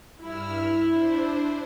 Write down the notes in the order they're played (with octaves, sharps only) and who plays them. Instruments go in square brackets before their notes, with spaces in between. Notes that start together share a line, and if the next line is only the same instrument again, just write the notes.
[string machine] G2 E6 F6 [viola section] E4
[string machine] D4 C5